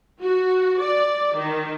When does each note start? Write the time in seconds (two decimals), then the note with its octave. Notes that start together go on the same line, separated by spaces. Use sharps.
0.22 F#4
0.81 D5
1.35 D#3